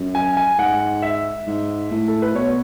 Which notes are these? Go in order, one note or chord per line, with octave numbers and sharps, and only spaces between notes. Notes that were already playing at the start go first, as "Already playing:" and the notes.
Already playing: F#2
G#5
G#5
G#2 F#5
E5
G#2
A2
A4
B4
B2 C#5